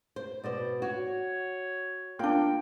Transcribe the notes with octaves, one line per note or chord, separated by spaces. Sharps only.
C5
B2 B3 C5 D5
F#4 C#5
A#3 D4 F4 G5